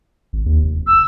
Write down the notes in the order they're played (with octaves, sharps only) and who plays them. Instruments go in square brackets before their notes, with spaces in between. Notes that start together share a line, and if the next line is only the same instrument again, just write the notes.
[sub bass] G#1
D#2
F1
[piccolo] E6